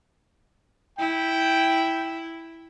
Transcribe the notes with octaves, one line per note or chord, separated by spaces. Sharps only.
E4 G5